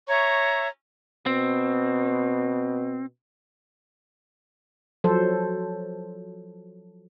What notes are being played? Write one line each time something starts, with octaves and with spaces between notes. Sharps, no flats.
C#5 E5 A#5 C#6
B2 C4
F3 F#3 A4 C5